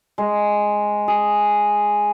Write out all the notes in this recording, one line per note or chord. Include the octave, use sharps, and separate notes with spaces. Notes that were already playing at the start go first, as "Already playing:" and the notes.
G#3
G#4